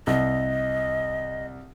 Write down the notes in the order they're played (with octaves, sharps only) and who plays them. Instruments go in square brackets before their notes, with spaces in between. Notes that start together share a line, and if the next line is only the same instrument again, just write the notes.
[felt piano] C2 [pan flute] D#5